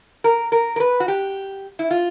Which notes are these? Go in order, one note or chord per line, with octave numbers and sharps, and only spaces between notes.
A#4
A#4
A#4
B4
F#4
G4
E4
F4